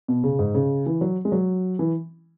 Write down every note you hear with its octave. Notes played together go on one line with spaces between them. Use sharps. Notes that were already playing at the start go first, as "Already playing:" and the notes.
B2
C#3
G#2
C#3
E3
F#3
G#3
F#3
E3